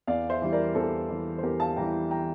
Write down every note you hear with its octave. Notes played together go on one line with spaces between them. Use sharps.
E2 D5 F5
C5 E5
E3 G3
A#4 D5
E2 A4 C5
E3 G3
C5
E2 G4 A#4
F5 A5
E3 G3 G5 A#5
G5 A#5